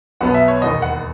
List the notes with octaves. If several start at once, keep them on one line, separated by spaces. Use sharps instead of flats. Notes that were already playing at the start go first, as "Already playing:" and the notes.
B1 B2 F#3 B3 F#5
E5
C#5
E1 D#2 D#3 D#5
F#5